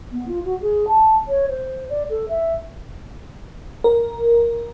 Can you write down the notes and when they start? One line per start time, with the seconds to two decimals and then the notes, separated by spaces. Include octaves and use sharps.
0.12 B3
0.28 F4
0.44 F#4
0.61 G#4
0.88 A5
1.28 C#5
1.48 C5
1.90 D5
2.10 A4
2.29 E5
3.84 A#4